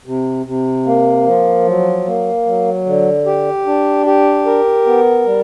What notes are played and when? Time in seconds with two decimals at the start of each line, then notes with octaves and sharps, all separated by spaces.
0.06 C3
0.46 C3
0.86 A#3
1.27 F3
1.66 F#3
2.06 A#3
2.46 F#3
2.86 D3
3.26 G4
3.66 D4
4.06 G4
4.46 A#4
4.86 B3
5.26 G3